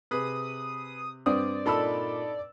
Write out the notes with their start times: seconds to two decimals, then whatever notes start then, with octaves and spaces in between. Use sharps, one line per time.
0.11 C3 G#4 B4 D#6
1.26 G2 C4 D5 D#6
1.66 A#2 D#4 A4 B5 E6